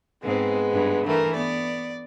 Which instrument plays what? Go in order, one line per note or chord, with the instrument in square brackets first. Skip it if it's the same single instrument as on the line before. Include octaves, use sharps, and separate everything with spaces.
[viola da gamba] G#2 C4 [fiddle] G#3 B3
[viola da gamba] G2
[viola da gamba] E3 [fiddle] A3 A#4
[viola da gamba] B3 [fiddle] D5